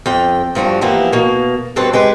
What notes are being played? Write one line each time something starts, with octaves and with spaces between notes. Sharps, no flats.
F2 G5
G2 F3 G3 F#4
E3 F3 A#3 B3 E4 G4
B2 A#3
G2 B2 C4 A4 B4
G#3 G4 B4